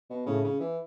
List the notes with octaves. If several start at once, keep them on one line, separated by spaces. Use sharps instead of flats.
B2
A2 C#3
C#3
E3